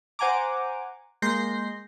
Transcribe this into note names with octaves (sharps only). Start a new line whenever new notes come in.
C5 F#5 G#5 A#5 D6
G#3 A#3 C6 G6 A#6 C7